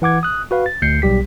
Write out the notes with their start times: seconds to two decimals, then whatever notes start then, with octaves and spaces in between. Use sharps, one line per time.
0.02 E3 F#5 D6 G#6
0.23 D#6 F#6
0.51 F#4 B4 F5
0.66 A6
0.82 D2 G6 C7 C#7
1.02 B1 G3 G4 B6